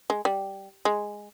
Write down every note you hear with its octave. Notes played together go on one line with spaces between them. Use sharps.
G#3
G3
G#3